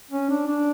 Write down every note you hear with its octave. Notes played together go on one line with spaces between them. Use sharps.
C#4
D4
D4